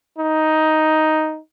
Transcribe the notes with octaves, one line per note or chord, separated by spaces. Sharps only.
D#4